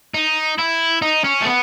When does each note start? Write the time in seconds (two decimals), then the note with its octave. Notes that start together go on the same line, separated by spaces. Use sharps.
0.14 D#4
0.58 E4
1.02 D#4
1.24 C#4
1.42 A3
1.45 B3